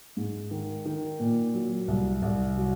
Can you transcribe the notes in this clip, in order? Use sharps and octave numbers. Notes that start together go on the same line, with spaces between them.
G#2
D#3
D#3
A#2
F#3
C2
C2
F#3